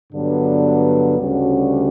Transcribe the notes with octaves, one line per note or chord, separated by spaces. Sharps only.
G2 D3 F#3 B3 D4
D2 C#3 G3 C#4 F#4